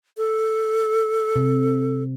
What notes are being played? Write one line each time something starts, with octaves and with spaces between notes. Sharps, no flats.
A4
C3